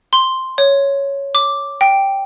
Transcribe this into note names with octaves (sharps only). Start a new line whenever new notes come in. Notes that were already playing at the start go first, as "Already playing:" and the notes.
C6
C#5
D6
G5